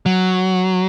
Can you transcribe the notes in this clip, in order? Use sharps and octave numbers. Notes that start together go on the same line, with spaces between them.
F#3